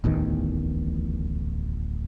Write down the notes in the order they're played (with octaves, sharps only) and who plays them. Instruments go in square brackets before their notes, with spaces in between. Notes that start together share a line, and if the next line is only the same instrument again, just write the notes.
[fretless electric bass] D1 A1 E2 D#3